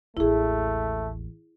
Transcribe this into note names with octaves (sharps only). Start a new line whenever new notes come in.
A1 D#2 A3 E4 G#4